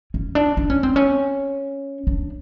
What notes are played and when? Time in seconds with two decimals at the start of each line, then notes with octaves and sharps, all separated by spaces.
0.14 C#4
0.35 D4
0.57 D4
0.70 C#4
0.83 C4
0.96 C#4
2.07 D4